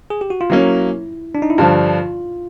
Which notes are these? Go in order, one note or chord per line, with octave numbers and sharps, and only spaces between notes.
G#4
G4
F#4
F4
F#3 A#3 C#4 E4
D4
D#4
E4
G2 D3 F3 F4